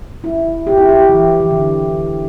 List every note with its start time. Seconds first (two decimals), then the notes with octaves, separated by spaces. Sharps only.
0.24 E4
0.67 G4
0.78 E4
0.89 G4
1.09 E3
1.40 E3
1.51 D3